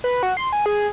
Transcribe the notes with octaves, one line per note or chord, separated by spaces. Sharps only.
B4
F#4
C6
G#5
G#4